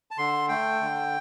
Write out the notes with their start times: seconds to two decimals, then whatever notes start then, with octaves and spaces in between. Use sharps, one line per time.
0.11 A5
0.18 D3 C6
0.49 A3 G5
0.81 D3